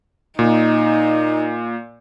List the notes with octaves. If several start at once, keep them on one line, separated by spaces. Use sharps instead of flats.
A#2 D#4